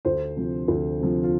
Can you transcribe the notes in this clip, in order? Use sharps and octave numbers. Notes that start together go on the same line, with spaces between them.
D2 C5
C3 F3
D2
C3 F3
F4